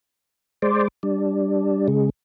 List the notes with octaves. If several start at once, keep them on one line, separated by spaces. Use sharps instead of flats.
G#3 C5 D5
G3 D4
C#3 G#3